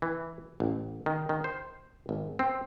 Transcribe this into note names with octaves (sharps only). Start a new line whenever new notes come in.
E3
A1
D#3
D#3
C5
G#1
C4